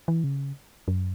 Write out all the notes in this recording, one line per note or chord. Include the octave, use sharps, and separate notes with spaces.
E3
C#3
F#2